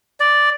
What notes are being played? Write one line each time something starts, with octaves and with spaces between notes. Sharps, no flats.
D5